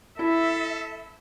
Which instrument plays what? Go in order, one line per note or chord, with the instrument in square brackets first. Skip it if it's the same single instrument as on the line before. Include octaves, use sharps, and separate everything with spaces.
[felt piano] E4 [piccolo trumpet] A4 [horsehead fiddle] E5